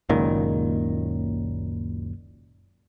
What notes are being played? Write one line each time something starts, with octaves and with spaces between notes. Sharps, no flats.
F#1 C#2 A#2 D#3